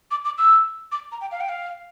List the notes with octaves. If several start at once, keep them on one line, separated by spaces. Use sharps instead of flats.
D6
D6
E6
D6
A#5
G5
F5
G5
F5